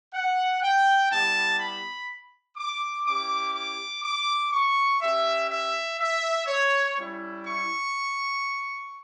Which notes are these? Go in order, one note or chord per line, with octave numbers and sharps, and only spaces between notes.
F#5
G5
G3 B3 E4 G4 A5
B5
D6
C#4 E4 G4 D6
D6
D6
C#6
C#4 G4 E5
E5
E5
C#5
G3 C#4 E4
C#6